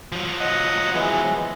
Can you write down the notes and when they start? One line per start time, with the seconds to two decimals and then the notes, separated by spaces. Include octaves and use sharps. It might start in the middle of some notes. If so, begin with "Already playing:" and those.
0.12 F3 F#3
0.40 D#5 F#5 D#6
0.94 E3 G#3 B3